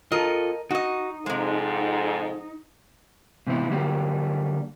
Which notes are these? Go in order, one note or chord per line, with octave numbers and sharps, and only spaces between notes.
F4 A4 A#4 D#5
D#4 F#4 D#5
F2 G#2 C3 G#3
G#2 C3 E3 B3 E4
D3 F#3 G3 A#3 G4